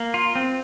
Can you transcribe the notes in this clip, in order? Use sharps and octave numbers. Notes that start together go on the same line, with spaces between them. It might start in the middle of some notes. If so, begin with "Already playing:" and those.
Already playing: A#3
F4
C4